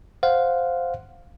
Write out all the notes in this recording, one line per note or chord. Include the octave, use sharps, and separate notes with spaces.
C5 F5 F#5